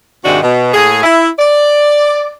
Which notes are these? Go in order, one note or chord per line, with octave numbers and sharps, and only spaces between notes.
G#2 C3 D#3 D4 F#4
B2
A2 A#3 G#4
E4
D5